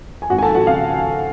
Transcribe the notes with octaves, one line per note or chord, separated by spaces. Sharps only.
G#5
G#1 F#4 F#5
G#5
A4 A5
F3
F#4 F#5
C#3 F5